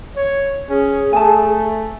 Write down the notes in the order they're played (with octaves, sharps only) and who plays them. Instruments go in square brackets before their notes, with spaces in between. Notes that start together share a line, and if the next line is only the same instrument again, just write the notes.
[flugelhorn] C#5
[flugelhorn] C#4 [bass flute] G#4
[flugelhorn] A3 [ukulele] G#5 A5